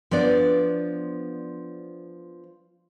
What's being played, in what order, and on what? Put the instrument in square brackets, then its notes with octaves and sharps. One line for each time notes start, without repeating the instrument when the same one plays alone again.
[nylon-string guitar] F3 B3 D4 D5